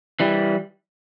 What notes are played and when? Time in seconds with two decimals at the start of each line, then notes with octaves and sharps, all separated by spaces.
0.20 E3 G3